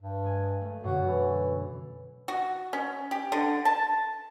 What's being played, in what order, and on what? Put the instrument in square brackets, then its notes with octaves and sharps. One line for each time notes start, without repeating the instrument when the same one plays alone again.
[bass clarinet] G2
[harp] G#3 G#5
A3
[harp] F#2 B2 D3 [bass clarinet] F#4
[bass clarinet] E3
[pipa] F#4
C#4
G4
D3
A5